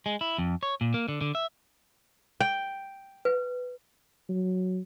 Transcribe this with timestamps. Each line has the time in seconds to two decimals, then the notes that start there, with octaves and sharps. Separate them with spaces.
0.06 G#3
0.21 E4
0.38 F2
0.63 C#5
0.81 A#2
0.94 A#3
1.08 D3
1.21 D3
1.35 E5
2.40 G5
3.25 B4
4.29 F#3